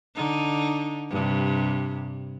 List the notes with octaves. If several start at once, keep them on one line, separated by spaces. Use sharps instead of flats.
D3 D#4
G2 C3